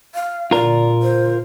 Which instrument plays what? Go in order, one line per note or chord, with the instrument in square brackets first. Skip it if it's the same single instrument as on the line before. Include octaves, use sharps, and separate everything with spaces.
[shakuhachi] F5
[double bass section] A#2 D3 [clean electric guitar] F4 A#4 [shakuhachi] D5
[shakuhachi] C5